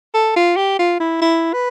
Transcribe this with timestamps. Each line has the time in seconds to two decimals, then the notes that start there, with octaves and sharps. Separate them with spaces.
0.14 A4
0.36 F4
0.57 G4
0.79 F4
1.00 E4
1.22 E4
1.53 B4